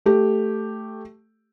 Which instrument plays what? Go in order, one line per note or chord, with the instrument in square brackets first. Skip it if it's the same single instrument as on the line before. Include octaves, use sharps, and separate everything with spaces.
[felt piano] A3 G4